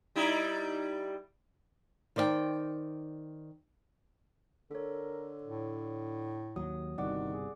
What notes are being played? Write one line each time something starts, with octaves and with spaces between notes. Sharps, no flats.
G3 D#4 E4
D#3 C5 D5 D#5 G5
D3 A4 A#4 C#5
A2
D#2 F#3 D#6
G1 C2 D#3 F#4 D5 F#5 D6
G#4